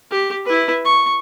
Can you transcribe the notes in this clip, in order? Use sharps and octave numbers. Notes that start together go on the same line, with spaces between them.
G4
E4 B4
C#6